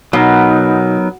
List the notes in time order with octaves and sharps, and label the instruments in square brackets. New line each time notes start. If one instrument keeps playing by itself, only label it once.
[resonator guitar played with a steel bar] B2 [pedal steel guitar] F#3 B3 A#4 [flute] D#4